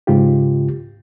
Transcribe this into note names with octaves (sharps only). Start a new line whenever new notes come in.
G#2 C#3 F4 G4